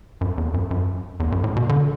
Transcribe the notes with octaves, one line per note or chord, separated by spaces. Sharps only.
F#2
E2
F#2
F#2
E2
F#2
A2
B2
D3